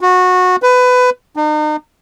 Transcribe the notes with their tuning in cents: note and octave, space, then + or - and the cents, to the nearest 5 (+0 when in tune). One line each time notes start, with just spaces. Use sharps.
F#4 -20
B4 +20
D#4 -40